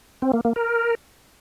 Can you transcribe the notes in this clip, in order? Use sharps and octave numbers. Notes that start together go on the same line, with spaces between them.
C4
A#3
A#3
A#4